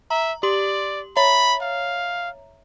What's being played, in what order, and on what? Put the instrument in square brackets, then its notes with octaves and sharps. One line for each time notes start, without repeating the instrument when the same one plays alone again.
[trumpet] E5 [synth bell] A#5
[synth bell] G4 C6 F#7 [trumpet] D5
[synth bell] C#5 E5 A#5 [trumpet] B5
[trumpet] F5